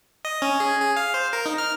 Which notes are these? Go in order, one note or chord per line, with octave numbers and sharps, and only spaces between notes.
D#5
C#4
G#4
G#4
F5
C5
A#4
D#4
F6